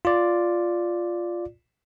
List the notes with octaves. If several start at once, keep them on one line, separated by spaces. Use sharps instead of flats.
F4 D5